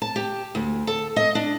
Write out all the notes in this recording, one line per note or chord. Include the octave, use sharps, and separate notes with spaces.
A5
G4
D2
A4
D#5
D4